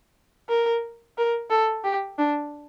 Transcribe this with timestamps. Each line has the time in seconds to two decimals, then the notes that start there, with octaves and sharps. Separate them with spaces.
0.49 A#4
1.18 A#4
1.50 A4
1.84 G4
2.18 D4